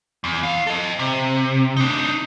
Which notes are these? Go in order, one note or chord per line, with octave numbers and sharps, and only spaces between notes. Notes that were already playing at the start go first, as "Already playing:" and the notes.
E2
E4 F5
A4 D#5
C3
D4 D#4